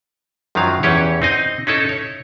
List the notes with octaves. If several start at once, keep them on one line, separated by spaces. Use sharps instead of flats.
F#2 D#3 F3 F#3 F5
E2 E3 C#4 G4 C#5
C4 D#4 D#5
C#4 D#4 E4 A4
C#5